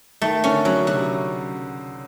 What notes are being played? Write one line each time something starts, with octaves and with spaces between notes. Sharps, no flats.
D#3 A3
D3 C#4
C#3 F#3
C#3
C3 F#4